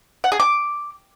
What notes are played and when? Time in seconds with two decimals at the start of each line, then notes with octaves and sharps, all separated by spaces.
0.24 F#5
0.32 G#4
0.40 D6